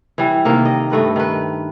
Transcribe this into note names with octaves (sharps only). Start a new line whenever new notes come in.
E3 G3
C3 D#3 A#3
D#5
G2 A3 B4 D#5
D#3 B4